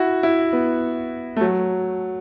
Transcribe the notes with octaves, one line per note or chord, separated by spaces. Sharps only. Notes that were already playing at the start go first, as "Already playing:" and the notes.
Already playing: E4 F#4
E4
B3
A3
F#3